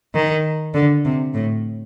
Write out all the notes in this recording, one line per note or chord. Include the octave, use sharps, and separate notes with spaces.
D#3
D3
C3
A2